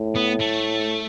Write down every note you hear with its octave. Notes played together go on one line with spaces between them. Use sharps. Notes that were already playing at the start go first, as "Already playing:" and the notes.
Already playing: A2
B3
A3